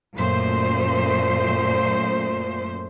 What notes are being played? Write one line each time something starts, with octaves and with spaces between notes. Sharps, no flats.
F#2 A#2 A3 C5